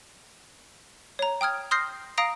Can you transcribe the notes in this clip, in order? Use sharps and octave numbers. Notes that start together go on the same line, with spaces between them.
C#5 A#5
G5 D#6 F6 G#6
C6 D#6 F6 G6 A#6 C7
F5 A#5 D#6 A#6 C7 D7